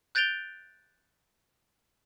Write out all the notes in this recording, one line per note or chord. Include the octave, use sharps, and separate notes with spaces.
F#6 G6 A6 D7 F7 G7